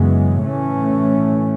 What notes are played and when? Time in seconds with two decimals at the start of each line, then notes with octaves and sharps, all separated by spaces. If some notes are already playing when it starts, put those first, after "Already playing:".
Already playing: F#2 C#3 E3 G#3 B3
0.45 A2 E3 A3 C#4